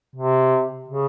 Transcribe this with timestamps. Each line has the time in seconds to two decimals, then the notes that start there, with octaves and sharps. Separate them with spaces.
0.15 C3
0.88 C#3